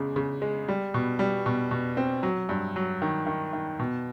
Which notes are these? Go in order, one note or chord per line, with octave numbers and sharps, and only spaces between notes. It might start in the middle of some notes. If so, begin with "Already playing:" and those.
Already playing: E2 C#3 G#3
C#3
G#3
G3
B2
G3
B2
B2
C4
F#3
G2
F#3
D#3
D#3
D#3
B2